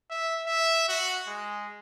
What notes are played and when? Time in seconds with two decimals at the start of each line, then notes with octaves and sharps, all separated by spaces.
0.10 E5
0.46 E5
0.89 F#4
1.27 G#3